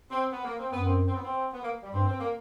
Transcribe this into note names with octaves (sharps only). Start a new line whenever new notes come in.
C4
B3
A#3
C4
F#2 B3
C4
C4
B3
C4
B3
A#3
G3
G2 C4
C4
A#3